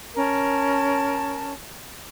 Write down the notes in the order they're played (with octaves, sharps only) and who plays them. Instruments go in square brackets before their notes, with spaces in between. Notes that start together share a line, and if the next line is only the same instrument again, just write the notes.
[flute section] C#4 A#4 A5